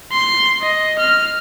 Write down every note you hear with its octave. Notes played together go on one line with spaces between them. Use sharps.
C6
D#5
F6